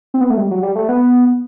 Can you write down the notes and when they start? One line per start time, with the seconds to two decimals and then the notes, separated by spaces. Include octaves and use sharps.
0.14 C4
0.21 B3
0.30 A3
0.37 G3
0.51 F#3
0.63 G3
0.75 A3
0.89 B3